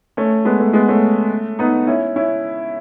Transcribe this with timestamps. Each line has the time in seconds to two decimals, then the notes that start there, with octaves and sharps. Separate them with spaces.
0.17 A3 C#4
0.45 G#3 B3
0.60 A3
0.73 G#3 B3
0.88 A3 C#4
1.59 B3 D#4
1.87 C#4 E4
2.16 C#4 E4